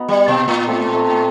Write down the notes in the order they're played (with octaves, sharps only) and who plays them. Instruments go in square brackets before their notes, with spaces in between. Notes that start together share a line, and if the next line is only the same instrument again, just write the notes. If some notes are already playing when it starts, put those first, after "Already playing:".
Already playing: [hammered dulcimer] B3 D#4 F#4
[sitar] G3
B2
A2
[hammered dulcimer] A3 C4
A3 C4